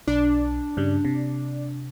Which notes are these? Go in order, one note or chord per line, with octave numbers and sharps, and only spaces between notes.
B1 D4
G2 C#3 G3
C3